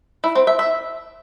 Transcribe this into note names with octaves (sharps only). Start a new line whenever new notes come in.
E4
C4
E5
E5